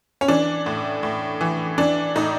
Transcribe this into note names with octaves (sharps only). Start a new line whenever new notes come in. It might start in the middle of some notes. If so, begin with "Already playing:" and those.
C#4
E3 D4
A2
A2
E3
E3 D4
A2 D#4